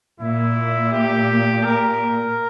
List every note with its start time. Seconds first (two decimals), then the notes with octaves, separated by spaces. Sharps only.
0.20 A#2 E4
0.92 G4
1.63 A#4